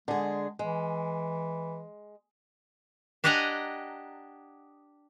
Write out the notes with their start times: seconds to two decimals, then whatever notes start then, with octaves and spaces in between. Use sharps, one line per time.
0.08 D3 G#3 G#4
0.59 E3 G#3
3.24 D4 G4 D#5 F#5 G#5 A#5